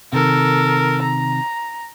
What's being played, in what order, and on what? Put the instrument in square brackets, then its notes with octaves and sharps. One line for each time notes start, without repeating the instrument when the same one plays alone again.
[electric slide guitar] C3 D#3 [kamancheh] A4 A#4
[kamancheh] A#5